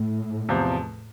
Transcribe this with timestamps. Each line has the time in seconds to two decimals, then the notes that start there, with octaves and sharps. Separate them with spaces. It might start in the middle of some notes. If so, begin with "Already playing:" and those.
Already playing: A2
0.49 E2 C3 F3